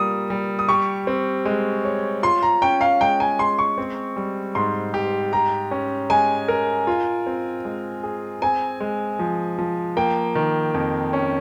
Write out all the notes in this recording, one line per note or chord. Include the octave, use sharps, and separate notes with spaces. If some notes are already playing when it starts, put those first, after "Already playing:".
Already playing: G3 A#3 F4 D#6
G3
D#6
G4 C#6
C4
G#3
C#5
F4 C6
A#5
C#4 G5
F5
G#3 G5
G#5
G#3 C6
C#6
C4
G3
G#2 C6
G4
G4 A#5
C#4
G#3 G#5
A#4
F4
C4
G#3
G#4
C4 G#5
G#3
F3
F3
A#3 G5
D#3
F2
C#4